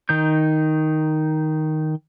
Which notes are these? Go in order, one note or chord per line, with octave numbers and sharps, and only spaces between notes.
D#3 D#4 G6